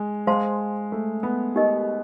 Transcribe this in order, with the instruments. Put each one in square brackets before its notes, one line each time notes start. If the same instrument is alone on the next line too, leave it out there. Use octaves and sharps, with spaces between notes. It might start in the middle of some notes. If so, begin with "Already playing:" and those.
Already playing: [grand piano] G#3
[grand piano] G#3 [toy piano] C5 F5 A5 C6
[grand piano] A3
B3
[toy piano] D#4 G4 A#4 D#5